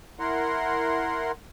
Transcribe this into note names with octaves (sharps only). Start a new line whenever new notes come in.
E4 A#4 F#5 C6